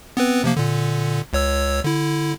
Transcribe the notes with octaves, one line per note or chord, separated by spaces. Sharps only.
B3 C4 B4
C3 F3 A#3
A#2 D3
C#2 C#5 E6
D3 E4